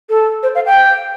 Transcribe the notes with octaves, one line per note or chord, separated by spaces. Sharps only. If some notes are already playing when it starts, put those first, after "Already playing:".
A4
C5
F5
G5